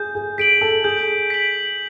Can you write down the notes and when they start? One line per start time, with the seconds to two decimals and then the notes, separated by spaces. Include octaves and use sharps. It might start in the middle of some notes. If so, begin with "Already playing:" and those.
Already playing: G#4 G6
0.15 G#4
0.38 G#4 B6 D7 F#7
0.61 A4
0.84 G#4 G6
1.30 B6 D7 F#7